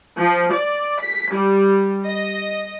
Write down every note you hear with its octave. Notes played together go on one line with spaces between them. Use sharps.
F3
D5
B6
G3
D#5